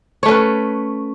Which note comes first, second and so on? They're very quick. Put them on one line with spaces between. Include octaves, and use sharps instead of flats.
C#5 A3 C#4 B4